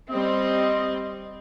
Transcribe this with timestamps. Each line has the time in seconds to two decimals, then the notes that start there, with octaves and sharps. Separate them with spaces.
0.11 G3 C4 D#5